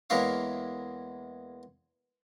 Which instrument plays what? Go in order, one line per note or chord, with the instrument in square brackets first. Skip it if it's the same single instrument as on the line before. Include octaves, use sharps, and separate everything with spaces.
[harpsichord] E2 G#3 A#3 E4 C#5 F5